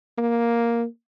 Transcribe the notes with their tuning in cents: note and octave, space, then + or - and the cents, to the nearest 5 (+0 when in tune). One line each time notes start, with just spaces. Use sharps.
A#3 +5